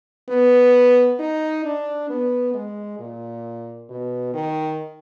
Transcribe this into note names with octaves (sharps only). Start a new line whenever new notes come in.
B3
D#4
D4
B3
G#3
A#2
B2
D#3